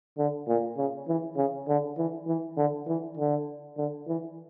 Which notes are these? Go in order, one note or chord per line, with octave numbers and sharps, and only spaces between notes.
D3
A#2
C#3
E3
C#3
D3
E3
E3
D3
E3
D3
D3
E3